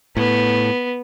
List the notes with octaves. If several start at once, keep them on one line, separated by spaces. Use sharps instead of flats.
A2 B3